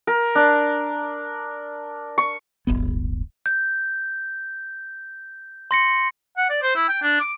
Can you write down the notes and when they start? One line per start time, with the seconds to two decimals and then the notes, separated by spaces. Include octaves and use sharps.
0.07 A#4
0.35 D4
2.18 C#6
2.67 D1 G1 B3
3.46 G6
5.71 C6 A#6 C#7
6.37 F#5
6.50 D5
6.63 C5
6.75 E4
6.88 G5
7.02 D4
7.21 D6